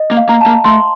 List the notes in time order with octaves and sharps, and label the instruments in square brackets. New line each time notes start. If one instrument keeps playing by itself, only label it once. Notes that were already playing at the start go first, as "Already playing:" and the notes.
Already playing: [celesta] D#5
[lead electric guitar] A#3
[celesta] F5
[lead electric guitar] A#3 [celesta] A#5
[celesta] A5
[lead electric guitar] A#3
[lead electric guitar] A3 [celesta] C6